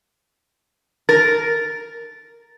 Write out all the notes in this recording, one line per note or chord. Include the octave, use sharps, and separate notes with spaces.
A#4 A6